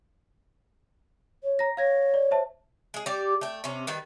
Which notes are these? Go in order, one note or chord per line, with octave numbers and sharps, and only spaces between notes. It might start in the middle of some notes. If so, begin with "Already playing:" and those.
C#5
A#5 A#6
C#5 F5 G#6 A#6
D5
C5 E5 A5
G#3 G#4
G3 G4 D5
A3 G5
C3 C#4
D#3 G3 B4